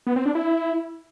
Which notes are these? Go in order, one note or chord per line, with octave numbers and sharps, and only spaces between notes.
B3
C4
D4
E4